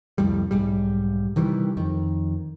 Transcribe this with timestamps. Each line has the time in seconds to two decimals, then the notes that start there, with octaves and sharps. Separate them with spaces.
0.18 C2 F2 A2 G3
0.51 B1 G#2 G3
1.36 C3 D#3 E3 G3
1.77 F2 D#3